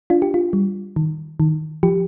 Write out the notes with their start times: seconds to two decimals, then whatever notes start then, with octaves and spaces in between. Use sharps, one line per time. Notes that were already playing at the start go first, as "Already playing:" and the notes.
0.10 D4 F4
0.22 G4
0.34 F4
0.53 G3
0.96 D#3
1.40 D#3
1.83 F3 G4